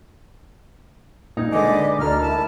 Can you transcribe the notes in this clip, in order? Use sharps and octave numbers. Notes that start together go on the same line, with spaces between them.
A#2 D#4
D3 G#3 B4 D5 D#5 D6
D2 A4 A#4 D5 F6
E4 A5 B5